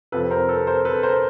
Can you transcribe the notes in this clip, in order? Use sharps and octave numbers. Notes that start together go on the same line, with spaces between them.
F2 C3 F3 A4 B4
A#4 C5
A4 B4
A#4 C5
A4 B4
A#4 C5